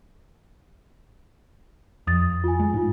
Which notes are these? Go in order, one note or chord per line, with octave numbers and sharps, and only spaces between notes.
F2 D#6 A6
F4 G#5
G#3
G#2 D#4 F4